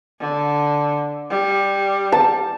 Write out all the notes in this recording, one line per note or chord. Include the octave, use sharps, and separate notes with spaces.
D3
G3
A5